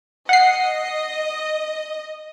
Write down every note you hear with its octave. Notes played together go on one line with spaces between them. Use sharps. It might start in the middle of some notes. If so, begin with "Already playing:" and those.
D#5 F#5 C7